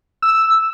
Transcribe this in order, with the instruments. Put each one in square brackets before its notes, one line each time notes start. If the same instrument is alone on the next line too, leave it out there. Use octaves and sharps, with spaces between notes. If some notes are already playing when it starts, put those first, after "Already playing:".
[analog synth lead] E6